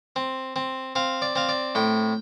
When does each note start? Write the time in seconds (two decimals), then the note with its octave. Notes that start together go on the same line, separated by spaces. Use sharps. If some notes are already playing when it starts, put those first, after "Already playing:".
0.16 C4
0.56 C4
0.95 C4 F5
1.22 D5
1.36 C4 F5
1.49 D5
1.75 A2 G5